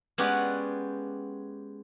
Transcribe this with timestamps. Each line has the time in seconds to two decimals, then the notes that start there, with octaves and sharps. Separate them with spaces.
0.18 G#3 B3 C#4 G4 D5 F#5